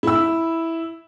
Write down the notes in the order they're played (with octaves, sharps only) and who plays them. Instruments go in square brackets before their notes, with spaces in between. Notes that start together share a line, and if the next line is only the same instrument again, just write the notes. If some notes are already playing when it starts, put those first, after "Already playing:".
[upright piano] E4 E6